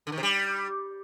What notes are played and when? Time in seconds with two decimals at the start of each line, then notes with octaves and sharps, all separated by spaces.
0.07 D3
0.12 D#3
0.17 C3
0.23 G3